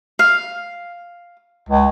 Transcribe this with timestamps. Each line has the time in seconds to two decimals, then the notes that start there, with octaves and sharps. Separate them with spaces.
0.19 F5
1.69 C#2